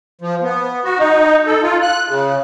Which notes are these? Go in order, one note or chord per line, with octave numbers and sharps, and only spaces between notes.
F3
B3
F#4
D#4
A4
F4
F#6
C#3